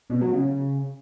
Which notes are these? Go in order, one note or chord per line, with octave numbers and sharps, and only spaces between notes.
B2
F#3
C#3